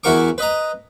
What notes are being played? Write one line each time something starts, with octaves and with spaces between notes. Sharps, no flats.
E2 E4 F#4 A#4 C#6 D6
B4 D#5 A#5